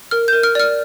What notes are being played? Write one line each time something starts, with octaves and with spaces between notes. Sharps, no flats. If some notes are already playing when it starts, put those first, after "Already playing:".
A#4 F6
A#4 G6
F6
D5 F6